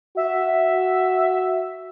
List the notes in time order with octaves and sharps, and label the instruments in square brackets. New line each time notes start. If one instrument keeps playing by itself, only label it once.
[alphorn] F#4 [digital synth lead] E5